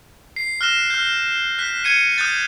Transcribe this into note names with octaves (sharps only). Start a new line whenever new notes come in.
C7
F6 F#6 A#6 E7
F6 G6
F#6 B6
F#6 G#6 C#7 D#7
D#6 F#6 G6 A6